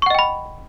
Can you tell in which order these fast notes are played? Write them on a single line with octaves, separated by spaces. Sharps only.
C#6 F#5 D#5 G5 B5